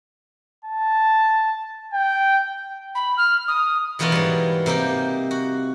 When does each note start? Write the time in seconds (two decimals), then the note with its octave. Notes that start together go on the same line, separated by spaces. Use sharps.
0.65 A5
1.94 G5
2.95 B5
3.17 F6
3.48 D#6
3.99 B2 E3 B3 F4 A#4 C#5
4.12 G#2 G3
4.66 C3 A#3 D#4 G4
5.31 F#4